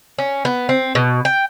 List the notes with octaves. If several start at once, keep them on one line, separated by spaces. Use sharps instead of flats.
C#4
B3
C4
B2
G5